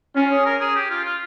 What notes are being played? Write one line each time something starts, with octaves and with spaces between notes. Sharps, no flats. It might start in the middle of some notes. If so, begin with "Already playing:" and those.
C#4 F4
G#4
A#4
G#4
G4
F4
F4